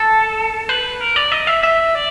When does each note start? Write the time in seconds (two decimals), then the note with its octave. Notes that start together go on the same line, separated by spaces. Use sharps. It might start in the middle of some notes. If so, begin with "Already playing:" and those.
Already playing: A4
0.69 B4
1.01 A#4
1.16 D5
1.32 D#5
1.47 E5
1.63 E5
1.95 D5